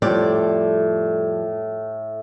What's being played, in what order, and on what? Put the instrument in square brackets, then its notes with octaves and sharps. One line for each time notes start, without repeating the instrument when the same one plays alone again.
[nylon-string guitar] F2 G3 D5 [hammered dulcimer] A2